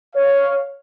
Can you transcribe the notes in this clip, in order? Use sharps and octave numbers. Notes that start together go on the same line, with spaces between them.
C#5 F5